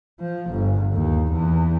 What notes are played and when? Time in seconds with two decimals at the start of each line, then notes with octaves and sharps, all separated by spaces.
0.20 F3
0.51 G1
0.94 D#2
1.32 E2